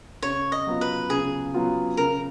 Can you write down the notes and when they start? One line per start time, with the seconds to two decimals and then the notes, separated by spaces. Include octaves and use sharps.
0.22 C#3 C#5
0.52 D#5
0.67 F#3 B3 F4
0.81 B4
1.10 C#3 G#4
1.54 F#3 B3 F4
1.97 C#3 A#4